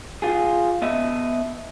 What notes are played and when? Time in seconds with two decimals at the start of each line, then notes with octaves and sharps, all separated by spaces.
0.22 F4 G#4
0.82 B3 D#5 E5